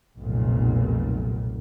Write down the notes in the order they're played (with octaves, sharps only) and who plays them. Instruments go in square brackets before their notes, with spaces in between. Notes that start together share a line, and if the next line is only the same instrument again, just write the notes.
[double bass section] F1 B1 A#2